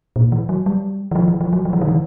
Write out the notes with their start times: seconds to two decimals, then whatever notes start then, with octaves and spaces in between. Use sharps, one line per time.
0.16 A#2
0.32 E3
0.49 F#3
0.66 G3
1.11 E3
1.16 F3
1.28 E3
1.41 F3
1.53 F#3
1.65 F3
1.73 E3
1.82 D#3
1.88 E3